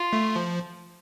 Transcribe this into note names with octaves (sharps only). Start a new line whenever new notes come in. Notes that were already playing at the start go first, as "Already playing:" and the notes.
Already playing: F4
A3
F3